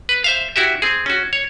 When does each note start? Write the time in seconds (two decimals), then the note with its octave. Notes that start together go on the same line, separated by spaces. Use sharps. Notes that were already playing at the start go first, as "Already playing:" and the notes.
0.09 B4
0.24 C5 E5 F5
0.56 E4 F#4 G4 E5
0.82 C4 G#4
1.06 C#4 F#4
1.33 C#5